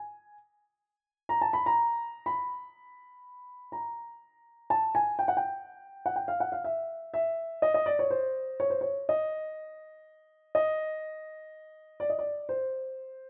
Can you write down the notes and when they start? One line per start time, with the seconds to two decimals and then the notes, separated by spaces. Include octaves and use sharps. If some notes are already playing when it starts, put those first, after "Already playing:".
Already playing: G#5
1.29 A#5
1.41 A5
1.53 B5
1.66 A#5
2.26 B5
3.72 A#5
4.70 A5
4.95 G#5
5.19 G5
5.28 F#5
5.37 G5
6.06 F#5
6.16 G5
6.28 F5
6.40 F#5
6.52 F5
6.64 E5
7.14 E5
7.62 D#5
7.74 D#5
7.86 D5
7.99 C#5
8.10 C5
8.60 C#5
8.70 C5
8.81 C#5
9.09 D#5
10.55 D#5
12.00 D5
12.10 D#5
12.19 D5
12.49 C5